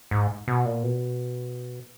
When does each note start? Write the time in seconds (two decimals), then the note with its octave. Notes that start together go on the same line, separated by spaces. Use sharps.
0.11 G#2
0.48 B2
0.65 A#2
0.83 B2